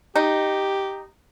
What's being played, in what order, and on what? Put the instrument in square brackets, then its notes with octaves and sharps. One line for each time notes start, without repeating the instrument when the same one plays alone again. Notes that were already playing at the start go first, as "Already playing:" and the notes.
[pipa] D#4 [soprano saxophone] G4